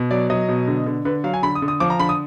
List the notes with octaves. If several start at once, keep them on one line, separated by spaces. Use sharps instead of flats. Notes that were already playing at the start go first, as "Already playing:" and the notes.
Already playing: B2
F#3 D5
F#3 D#5
B2
D3
D3
D3 B4
F#3 F5
G#5
D3 B5
D#6
D3
D#6
F3 D6
A#5
D3 B5
D#6